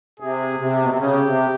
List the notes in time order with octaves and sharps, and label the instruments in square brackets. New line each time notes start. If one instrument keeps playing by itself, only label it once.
[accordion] C3 [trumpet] G#4
[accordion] C3
B2
C3
[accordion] C#3 [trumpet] G4
[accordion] C3